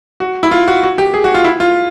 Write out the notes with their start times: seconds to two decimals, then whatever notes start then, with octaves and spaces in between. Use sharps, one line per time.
0.20 F#4
0.43 E4
0.51 F4
0.68 F#4
0.83 F#4
0.98 G4
1.14 G#4
1.24 F#4
1.34 F4
1.44 E4
1.60 F4